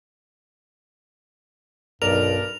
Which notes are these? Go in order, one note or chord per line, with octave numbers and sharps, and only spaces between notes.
B1 G2 A#4 D5 F7